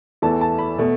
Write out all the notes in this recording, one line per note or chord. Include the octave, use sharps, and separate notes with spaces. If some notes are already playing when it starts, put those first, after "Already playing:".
E2 E3 A3 A5
A5
B5
B2 A3